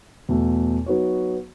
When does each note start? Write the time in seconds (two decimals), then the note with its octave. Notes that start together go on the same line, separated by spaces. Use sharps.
0.29 E2 B2 A3
0.86 F#3 B3 D#4 F#4 C#5